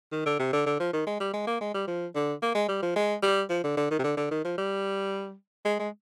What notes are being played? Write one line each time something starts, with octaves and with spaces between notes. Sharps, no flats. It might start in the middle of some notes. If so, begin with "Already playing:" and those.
D#3
D3
C3
D3
D3
F3
D#3
G#3
G3
G#3
A#3
G#3
G3
F3
D3
A#3
G#3
G3
F3
G#3
G3
F3
D3
D3
D#3
C3
D3
D3
D#3
F3
G3
G#3
G#3